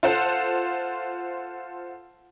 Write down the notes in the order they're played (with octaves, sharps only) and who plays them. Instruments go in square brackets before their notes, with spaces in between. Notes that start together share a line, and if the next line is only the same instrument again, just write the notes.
[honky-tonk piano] F4 A4 C5 F#5